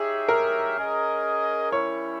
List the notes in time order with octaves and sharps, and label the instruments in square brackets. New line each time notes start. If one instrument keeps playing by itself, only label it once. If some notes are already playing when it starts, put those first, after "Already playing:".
Already playing: [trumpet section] D#4 G4 C#5 E5 [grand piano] G#4
[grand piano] A#4
[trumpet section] C#4 G#4 D#5
[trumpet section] G3 C#4 E4 [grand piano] C#5